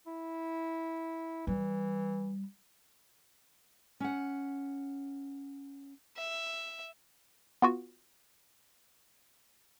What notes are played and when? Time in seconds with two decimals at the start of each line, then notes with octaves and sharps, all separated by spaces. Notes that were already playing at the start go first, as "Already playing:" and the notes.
0.07 E4
1.47 E3 G3
4.00 C#4 F#5
6.17 E5
7.62 B3 F4 F#4